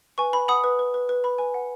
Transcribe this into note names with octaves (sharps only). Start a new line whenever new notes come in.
B4 G#5 C#6
B4 B5
F#5 B5 D#6
B4
B4
B4
B4
B4 B5
B4 G#5
F#5